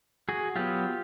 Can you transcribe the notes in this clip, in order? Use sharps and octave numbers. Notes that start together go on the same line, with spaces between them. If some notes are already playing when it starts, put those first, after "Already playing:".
F#4 G#4
F#3 B3 F4 G4